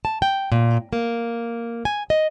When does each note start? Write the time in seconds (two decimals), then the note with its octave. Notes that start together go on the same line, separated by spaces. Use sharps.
0.05 A5
0.22 G5
0.52 A#2
0.93 A#3
1.85 G#5
2.10 D#5